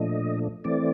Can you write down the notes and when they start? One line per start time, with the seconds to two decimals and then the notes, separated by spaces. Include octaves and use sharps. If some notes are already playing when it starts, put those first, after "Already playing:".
Already playing: A#2 F3 A3 D4 D#5
0.64 E3 A3 C4 D5